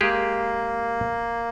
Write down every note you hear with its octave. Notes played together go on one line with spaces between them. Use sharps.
G#3 A#3 G4 G#4